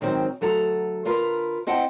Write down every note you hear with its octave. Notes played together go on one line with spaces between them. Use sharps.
G#2 D#3 F#3 C4
D2 F#3 A4 A#5
D3 F4 A#4 B4 A#5
C4 E4 D#5 F#5 G5 A5